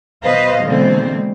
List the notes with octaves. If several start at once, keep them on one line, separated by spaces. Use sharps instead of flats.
B2 B4 C5 D#5 F5
B2 D3 E3 G#3 A#3 C4